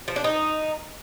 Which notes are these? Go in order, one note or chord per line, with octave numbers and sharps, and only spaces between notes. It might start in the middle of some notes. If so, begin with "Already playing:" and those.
F3
D4
D#4